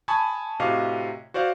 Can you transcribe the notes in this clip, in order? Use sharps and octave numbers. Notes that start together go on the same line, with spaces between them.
G#5 A5 B5 C#6 D#6 G#6
A2 C3 F#4 D#5 F5 D6
F#4 C5 D5 F5